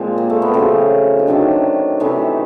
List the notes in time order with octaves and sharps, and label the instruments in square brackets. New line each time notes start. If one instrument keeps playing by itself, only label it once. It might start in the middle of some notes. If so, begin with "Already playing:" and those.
Already playing: [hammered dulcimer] A#2 F3 G#3 C4
A#3
A3
B3
C#3 F#3 A3 C4
D#4
C3 D#3 F#3 A3 D4
C3 E3 A3 D#4